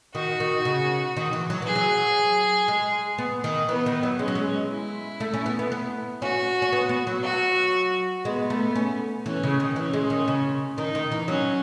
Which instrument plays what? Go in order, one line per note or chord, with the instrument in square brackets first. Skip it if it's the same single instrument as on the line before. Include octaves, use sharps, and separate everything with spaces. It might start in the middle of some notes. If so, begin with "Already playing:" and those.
[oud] D#3 [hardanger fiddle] F#4
[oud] D#3
C#3
D#3
E3
F#3
[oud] E3 [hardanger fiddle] G#4
[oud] F#3
G#3
B3
D#3
[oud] E3 [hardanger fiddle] B3
[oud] D#3
F#3
[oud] G#3 [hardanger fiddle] C#4
[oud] F#3
G#3
[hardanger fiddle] E4
[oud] A3
C#4
B3
B3
B3
[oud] C#4 [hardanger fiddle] F#4
[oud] C#4
B3
B3
F#3
[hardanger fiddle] F#4
[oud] G#3 [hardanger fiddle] B3
[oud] A3
C#4
[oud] E3 [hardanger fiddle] C#4
[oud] C#3
D#3
[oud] E3 [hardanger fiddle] C#4
[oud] G#3
D#3
C#3
[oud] D#3 [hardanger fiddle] D#4
[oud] D#3
E3
[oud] F#3 [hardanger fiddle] C#4